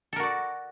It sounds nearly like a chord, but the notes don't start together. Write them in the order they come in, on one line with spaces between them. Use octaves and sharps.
A4 A#4 F#4 D5